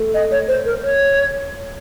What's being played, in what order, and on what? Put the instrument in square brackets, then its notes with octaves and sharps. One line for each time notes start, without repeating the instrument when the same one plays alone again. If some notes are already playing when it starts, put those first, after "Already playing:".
Already playing: [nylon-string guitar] A3
[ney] D#5
C#5
C5
A#4
C#5